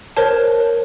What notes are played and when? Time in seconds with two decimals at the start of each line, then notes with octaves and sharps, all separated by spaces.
0.17 A#4 C5 C#5 A5